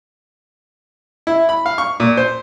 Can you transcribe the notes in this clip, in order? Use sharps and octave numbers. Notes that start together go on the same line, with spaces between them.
E4
B5
F5
C#6
A#2
C5